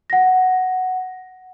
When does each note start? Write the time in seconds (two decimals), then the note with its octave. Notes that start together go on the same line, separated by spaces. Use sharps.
0.10 F#5 A#6